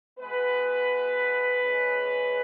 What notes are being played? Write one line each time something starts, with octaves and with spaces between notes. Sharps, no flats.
B2 G#3 B3 B4
E2 C#3 G#3 C#4